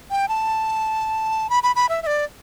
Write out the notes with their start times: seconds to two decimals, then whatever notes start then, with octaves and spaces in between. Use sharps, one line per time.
0.11 G5
0.29 A5
1.50 B5
1.63 B5
1.76 B5
1.89 E5
2.03 E5
2.07 D5